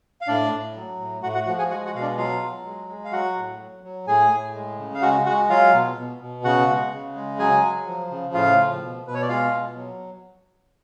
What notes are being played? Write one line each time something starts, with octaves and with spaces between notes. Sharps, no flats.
F5
A2 D4 D5
A2
F#3
A2
A2 F#4 F#5
F#4 F#5
F3 F#4 F#5
G#4 G#5
G#3 F#4 F#5
F#4 F#5
B2 F5
D4 D5
F#3 F4 F5
F#3
G#3
G#3
F5
F#3 F#4 F#5
A2
F#3
F#3
A2 G#4 G#5
A2
G#3
C#3
F5
G#3 F#4 F#5
G#3 F#4 F#5
F#3 F4 F5
B2
B2
B2
C#3 F#4 F#5
G#3
C#3
G#3
F#3 G#4 G#5
F#3
F3
C#3
A2 F4 F5
F3
B2
B2 B4
C#5
D5
G#3 F4 F5
B2
F#3